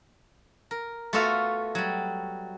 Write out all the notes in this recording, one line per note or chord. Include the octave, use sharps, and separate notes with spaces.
A#4
A3 B3 F4 F#4 E5 F5
F#3 G3